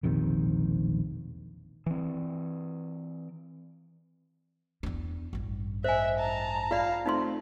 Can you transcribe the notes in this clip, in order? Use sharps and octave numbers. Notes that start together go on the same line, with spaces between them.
E1 A#1 C3 D#3
E3 C4
E2 D4
A1 G2
C5 D#5 E5 G#5
A5 A#5
F4 D5 F5 B5
A3 C4 D#4 F4 C6